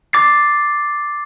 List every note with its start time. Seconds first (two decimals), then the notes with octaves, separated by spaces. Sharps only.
0.13 D6 A6 C7